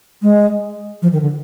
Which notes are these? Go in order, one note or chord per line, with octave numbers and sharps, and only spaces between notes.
G#3
F3
D#3
D3